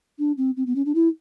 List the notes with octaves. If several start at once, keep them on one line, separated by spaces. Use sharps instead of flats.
D4
C4
C4
B3
C#4
D4
E4